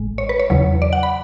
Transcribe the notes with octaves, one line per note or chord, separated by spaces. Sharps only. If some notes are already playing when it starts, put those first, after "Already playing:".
Already playing: A1 A2 G#3
C#5
B4
C#5
E2 C#3 F#3
D5
F#5
B5